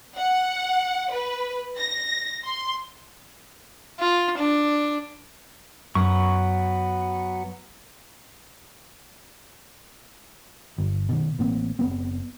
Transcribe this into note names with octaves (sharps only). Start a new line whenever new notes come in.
F#5
B4
A#6
C6
F4
D4
F#2 F#3 B3 C#6
G1
B2 D#3
A1 A#3 C4
F#1 B3 C4